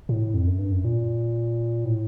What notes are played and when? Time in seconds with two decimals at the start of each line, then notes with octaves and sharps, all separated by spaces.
0.09 A2
0.34 F2
0.47 F#2
0.59 G2
0.72 F#2
0.85 A#2
1.85 A2